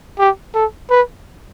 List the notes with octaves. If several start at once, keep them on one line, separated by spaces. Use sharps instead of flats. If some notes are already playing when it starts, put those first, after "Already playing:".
G4
A4
B4